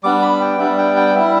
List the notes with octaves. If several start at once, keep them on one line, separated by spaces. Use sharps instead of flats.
G3 B3 D4 D6
B5
G5
G3 B3 D4 E5
G5
G5
G3 E4 E5